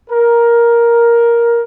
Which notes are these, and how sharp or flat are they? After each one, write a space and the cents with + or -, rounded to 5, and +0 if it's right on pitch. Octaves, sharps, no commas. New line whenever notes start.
A#4 +10